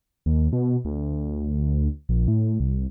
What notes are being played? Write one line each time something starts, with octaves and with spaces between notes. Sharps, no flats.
D#2
B2
D2
A#1
A2
C2